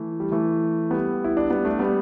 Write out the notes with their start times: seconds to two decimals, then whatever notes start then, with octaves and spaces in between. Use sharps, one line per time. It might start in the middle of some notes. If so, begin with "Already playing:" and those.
Already playing: E3 A3
0.20 G3
0.32 E3 A3
0.90 G3 B3
1.24 E4
1.37 D4
1.50 G3 B3
1.65 A3 D4
1.79 G3 B3